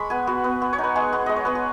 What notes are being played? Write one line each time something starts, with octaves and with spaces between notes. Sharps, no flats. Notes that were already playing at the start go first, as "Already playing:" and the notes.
Already playing: G#3 B5 C#6
B3 G#5
B3 F#4
B3
B3
C#5
D#4
B4
G#3 G#4
B3
G#3 D#5
C#5
B3 B4
G#4